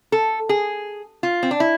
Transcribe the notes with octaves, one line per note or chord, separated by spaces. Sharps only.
A4
G#4
F4
C4
D4
E4